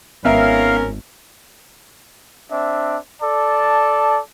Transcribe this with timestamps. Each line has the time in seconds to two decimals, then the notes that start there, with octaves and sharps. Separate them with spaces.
0.25 G#1 B3 C#4 A#4 E5 F5
2.51 C4 D4 E5
3.22 A4 D5 A5